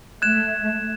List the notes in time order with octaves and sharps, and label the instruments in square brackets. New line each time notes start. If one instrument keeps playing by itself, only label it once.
[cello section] A3 [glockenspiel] F#6 G#6 E7